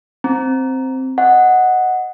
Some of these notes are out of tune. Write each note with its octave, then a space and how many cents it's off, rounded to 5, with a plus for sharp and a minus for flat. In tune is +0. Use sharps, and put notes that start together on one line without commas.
C4 +0 A#5 +0
D#5 +0 F#5 +0